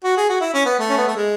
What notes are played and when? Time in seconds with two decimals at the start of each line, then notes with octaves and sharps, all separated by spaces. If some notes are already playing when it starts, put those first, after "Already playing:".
0.04 F#4
0.17 G#4
0.29 F#4
0.41 E4
0.54 C#4
0.66 B3
0.79 A3
0.89 C#4
0.98 B3
1.07 A3
1.15 G#3